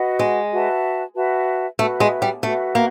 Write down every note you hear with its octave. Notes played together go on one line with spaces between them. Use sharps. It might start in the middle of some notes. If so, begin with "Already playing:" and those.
Already playing: F#4 B4 D#5 F#5
G#3
F#4 B4 E5 A5
F#4 B4 E5 A5
A3 F#4 B4 E5
G#3
G3
A3 F#4 B4 E5
A#3